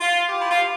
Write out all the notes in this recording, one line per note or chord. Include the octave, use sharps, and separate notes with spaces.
F4
G4
E4
F4